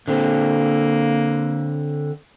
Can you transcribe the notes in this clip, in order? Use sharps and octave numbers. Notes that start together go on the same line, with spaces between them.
D3 A#3 C4